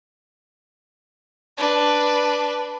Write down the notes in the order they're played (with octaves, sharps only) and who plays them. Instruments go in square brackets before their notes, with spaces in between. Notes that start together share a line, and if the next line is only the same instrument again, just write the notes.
[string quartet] D4 B4